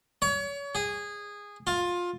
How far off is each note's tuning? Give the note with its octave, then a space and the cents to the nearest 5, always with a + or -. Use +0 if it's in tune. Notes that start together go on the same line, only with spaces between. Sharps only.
C#5 +35
G#4 -15
F4 +15